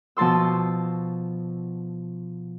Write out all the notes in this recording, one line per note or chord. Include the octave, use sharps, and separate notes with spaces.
B2 F3 A5 C6 E6